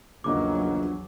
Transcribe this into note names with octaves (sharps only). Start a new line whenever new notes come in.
A#1 E2 C#3 F#3 A#3 D#4 D6